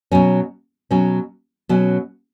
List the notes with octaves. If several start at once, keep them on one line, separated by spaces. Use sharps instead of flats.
B2 F#3 C#4
B2 F#3 C#4
B2 F#3 C#4